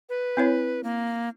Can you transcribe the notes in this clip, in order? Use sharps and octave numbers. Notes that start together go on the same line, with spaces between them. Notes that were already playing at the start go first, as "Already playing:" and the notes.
B4
C4 E4 C#5
A#3